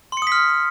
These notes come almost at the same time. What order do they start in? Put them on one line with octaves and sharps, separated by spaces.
C6 C#7 D#6 B6 F6